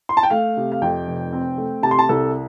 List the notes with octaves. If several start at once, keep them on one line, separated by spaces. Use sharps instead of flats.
C6
A5
G5
A3 F5
C3
F5
F2 G5
F1
C4
A3
C3 A5
C6
A5
C2 A4